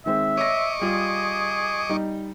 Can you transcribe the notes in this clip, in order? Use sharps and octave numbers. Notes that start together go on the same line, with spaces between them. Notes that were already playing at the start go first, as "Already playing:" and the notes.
D#3 G#3 C4 E5
C#5 D#5 C#6 D6 A#6
G3 F4 G#4
G3 D#4